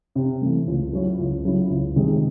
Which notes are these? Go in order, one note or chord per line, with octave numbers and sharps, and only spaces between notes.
C3
E3 A3
C#2
C#3 F#3 C#4 E4
C#2
C#3 F#3 C#4 E4
C#2
C3 D#3 G#3